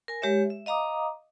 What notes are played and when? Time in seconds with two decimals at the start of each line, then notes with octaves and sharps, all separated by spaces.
0.08 A#4 G#5
0.22 G#3 G4 C#5 E5
0.50 E5
0.66 D#5 F5 A#5 D6 D#6